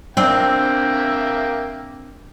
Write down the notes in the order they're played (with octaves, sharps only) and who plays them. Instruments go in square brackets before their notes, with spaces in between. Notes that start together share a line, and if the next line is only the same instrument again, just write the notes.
[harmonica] A#3 E5 G5 [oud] C4 D4